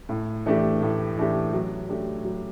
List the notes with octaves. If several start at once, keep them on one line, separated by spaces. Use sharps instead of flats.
A2
E3 A3 D4 G4
A2
E3 A3 D4 G4
F#3
A3 D4 G4
F#3